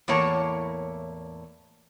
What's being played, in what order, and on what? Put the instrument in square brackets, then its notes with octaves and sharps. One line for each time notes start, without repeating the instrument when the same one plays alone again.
[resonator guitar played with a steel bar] E2 A2 A#3 C#5 A5